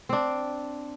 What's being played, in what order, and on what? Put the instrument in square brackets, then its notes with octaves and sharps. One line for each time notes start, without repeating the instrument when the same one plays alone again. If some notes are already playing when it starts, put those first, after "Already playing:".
[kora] C4 D4